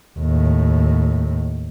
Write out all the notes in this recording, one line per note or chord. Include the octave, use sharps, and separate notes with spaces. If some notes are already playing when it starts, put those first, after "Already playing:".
D#2 A2